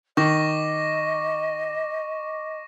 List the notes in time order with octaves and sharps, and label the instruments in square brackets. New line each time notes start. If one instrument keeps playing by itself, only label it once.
[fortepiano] D#3 [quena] D#5 [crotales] C#6 D6 A#6